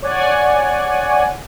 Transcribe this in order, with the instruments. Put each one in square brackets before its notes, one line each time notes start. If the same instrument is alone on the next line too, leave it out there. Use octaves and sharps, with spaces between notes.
[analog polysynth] C#5 D5 F#5 G#5